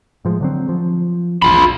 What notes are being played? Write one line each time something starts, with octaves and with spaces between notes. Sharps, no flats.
A2 F3 G#3
D3 F#3 C4
F3
A#1 E2 F4 B5